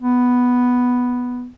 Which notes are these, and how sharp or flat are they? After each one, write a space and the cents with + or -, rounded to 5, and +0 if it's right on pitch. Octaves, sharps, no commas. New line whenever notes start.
B3 +0